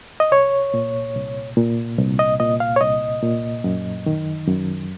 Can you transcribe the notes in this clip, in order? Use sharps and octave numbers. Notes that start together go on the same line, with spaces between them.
D#5
C2 C#5
A#2
C2
A#2
C2
D#5
A#2 D#5
F5
C#5
C2 D#5
A#2
F#2
D#3
F#2